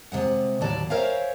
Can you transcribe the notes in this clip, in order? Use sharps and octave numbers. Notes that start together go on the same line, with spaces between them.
C3 G#3 F#5
D#2 A2 D3 F#3 D5 A5
A#4 C5 C#5 E5 F5 G#5